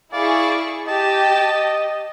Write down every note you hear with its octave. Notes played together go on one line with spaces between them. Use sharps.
E4 G#4 D5 F5 C#6
G4 D#5 A5